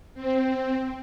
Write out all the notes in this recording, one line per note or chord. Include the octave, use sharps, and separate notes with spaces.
C4